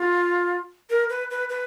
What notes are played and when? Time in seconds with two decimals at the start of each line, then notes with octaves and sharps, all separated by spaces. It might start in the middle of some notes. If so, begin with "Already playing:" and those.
Already playing: F4
0.90 A#4
1.10 B4
1.31 B4
1.50 B4